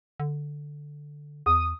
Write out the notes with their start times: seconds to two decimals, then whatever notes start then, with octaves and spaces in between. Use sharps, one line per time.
0.20 D3
1.46 E2 D#6